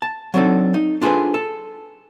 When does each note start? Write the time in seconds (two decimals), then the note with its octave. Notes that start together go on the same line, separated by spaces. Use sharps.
0.02 A5
0.34 F#3 C4 D4 D#4 A4
0.74 D#4
1.01 D4 F4 G#4 A4 B4 C5
1.34 A4